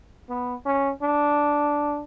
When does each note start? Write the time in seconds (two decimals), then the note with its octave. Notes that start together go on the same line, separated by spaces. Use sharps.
0.29 B3
0.66 C#4
1.02 D4